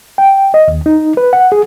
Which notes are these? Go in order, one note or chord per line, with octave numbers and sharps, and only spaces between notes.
G5
D#5
D#2
D#4
B4
F#5
G#4